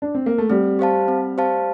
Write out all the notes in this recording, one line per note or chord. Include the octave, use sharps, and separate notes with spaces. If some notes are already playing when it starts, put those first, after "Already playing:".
D4
C4
A#3
A3
G3 C4
G4 C5 F5 A5
C4
G4 C5 F5 A5